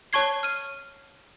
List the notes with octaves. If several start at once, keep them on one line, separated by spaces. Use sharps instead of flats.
C#5 A5 C#6 G#6 C7
F6 D#7